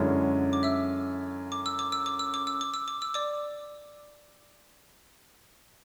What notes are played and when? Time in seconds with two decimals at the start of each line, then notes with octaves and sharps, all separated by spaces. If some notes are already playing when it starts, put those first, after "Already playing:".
Already playing: F#2 D3 G#3 C#4 E4 D5
0.53 D6
0.63 E5 E6
1.52 D6
1.66 E6
1.79 D6
1.92 E6
2.06 D6
2.19 E6
2.34 D6
2.47 E6
2.61 D6
2.74 E6
2.88 D6
3.02 E6
3.14 D5 D6